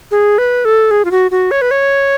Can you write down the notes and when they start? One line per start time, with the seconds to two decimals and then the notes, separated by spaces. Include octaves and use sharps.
0.11 G#4
0.38 B4
0.65 A4
0.91 G#4
1.05 F4
1.11 F#4
1.31 F#4
1.51 C#5
1.62 B4
1.71 C#5